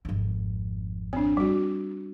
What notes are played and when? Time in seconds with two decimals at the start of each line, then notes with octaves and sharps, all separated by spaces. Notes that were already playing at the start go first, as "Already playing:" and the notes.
0.05 G#1 F2
1.13 C4 D4
1.37 G3 F#4